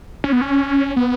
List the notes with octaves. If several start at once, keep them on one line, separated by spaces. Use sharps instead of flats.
C#4
B3
C#4
B3